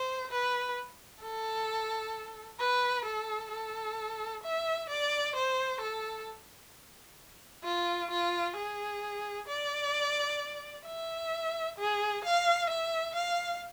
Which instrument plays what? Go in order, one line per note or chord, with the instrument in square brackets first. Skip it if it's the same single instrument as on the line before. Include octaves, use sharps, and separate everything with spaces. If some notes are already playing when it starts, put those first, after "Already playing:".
Already playing: [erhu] C5
B4
A4
B4
A4
A4
E5
D5
C5
A4
F4
F4
G#4
D5
E5
G#4
F5
E5
F5